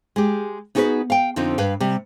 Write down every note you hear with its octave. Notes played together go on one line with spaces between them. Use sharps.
G#3 G4
B3 D#4 F#4 G#4 A#4 B4
F5 G5
F2 D3 C4 D#4 F4
G2 B4 F5
C3 G3